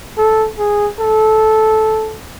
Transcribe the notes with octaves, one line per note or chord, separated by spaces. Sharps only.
A4
G#4
A4